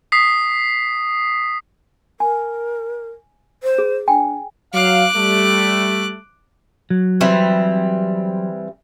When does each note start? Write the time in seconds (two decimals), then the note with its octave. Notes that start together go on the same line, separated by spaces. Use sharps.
0.12 D#6 B6 C7
2.20 A#4 G#5
3.63 C5
3.78 G#4
4.08 D4 G5 G#5
4.74 F#3 F5 D6 F#6
5.16 G3 A3
6.90 F#3
7.21 E3 G3 C4